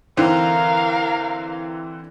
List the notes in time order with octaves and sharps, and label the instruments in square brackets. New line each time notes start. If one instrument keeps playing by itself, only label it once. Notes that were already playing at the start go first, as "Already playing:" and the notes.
[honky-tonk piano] D3 E3 C4 [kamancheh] A#4 F5